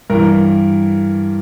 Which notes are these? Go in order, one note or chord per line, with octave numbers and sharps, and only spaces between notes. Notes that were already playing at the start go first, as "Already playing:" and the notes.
G2 E3 A#4